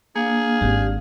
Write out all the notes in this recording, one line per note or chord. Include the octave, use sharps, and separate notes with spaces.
A#3 D4 G#4 F5
G#1 G4